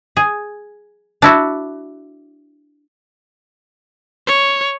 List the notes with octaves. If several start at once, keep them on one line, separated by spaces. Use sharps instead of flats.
G#4
D4 E4 F#4
C#5